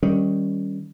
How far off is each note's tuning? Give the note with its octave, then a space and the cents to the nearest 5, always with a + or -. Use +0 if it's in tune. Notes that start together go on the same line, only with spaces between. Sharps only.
D#3 +10 G3 +0 C#4 +0